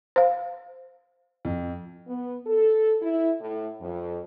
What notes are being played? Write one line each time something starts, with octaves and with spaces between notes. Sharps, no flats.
C5 F5
F2
B3
A4
E4
A2
F2